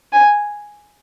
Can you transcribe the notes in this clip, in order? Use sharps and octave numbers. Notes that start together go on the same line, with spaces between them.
G#5